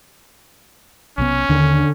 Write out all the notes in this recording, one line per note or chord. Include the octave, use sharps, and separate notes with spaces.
B1 C3 B3 C#4
D#2 D3 D#3